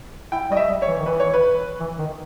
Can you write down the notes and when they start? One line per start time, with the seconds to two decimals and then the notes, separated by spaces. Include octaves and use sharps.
0.32 E4 G5
0.50 G3 D#5
0.57 E5
0.69 G3
0.82 C#5
0.87 E3
0.98 D#3
1.06 E3 B4
1.20 C#5
1.34 B4
1.80 E3
1.99 D#3